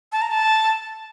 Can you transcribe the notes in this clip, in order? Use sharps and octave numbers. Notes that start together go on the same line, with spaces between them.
A5
A#5
A5